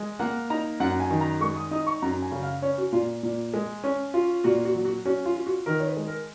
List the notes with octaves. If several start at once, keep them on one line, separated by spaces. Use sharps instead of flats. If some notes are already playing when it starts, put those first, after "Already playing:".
Already playing: G#3
A#3 F#5
D#4 A#5
F#2 F#5
G#5
D#3
A#5
G#3 C#6
D#6
D#4 D#6
C#6
F#2 A#5
G#5
C#3
F5
C#4 C#5
F#4
A#2 F4
A#2
G#3
C#4
F4
A#2 F#4
F#4
F#3
F#4
C#4 F#4
F4
F4
F#4
D#3 A#4
C#5
B4
G#3
A#4